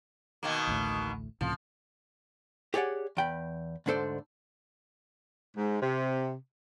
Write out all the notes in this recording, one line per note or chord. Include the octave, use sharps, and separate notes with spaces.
B2 D#3 A#3
A1 D2 A2
C#2 A2 C3 F3
G4 G#4 C#5 D5 F#5
E2 G5 B5
D2 G#2 D4 A4 C5 D5
G#2
C3